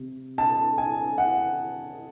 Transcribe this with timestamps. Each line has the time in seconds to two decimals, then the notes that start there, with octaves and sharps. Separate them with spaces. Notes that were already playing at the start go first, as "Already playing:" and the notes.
Already playing: C3
0.38 A5
0.78 G#5
1.18 F#5